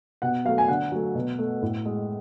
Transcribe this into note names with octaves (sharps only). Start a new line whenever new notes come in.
B2 F#5
F#3 A3 F5
G#5
D3 F#5
F#3 A3
B2
A3
A2
G#3